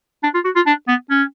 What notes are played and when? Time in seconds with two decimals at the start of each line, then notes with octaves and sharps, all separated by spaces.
0.23 D4
0.34 F4
0.45 F#4
0.56 F4
0.66 D4
0.88 B3
1.10 C#4